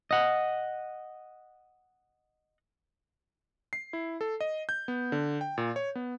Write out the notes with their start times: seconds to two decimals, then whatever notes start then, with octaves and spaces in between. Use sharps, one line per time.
0.11 D#5 F#5
3.73 C7
3.93 E4
4.21 A4
4.40 D#5
4.69 G6
4.88 B3
5.12 D3
5.41 G5
5.58 A#2
5.76 C#5
5.95 B3